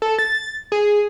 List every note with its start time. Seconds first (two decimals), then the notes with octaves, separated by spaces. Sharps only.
0.02 A4
0.19 A6
0.72 G#4